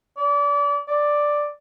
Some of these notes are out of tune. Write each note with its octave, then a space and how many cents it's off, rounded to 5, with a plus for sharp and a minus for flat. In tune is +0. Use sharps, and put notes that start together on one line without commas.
D5 -30
D5 +5